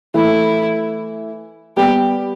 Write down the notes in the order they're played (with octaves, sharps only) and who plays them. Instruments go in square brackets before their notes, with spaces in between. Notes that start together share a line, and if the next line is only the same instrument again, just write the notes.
[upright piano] E3 A3 [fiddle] E4
[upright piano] G3 B3 [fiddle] G4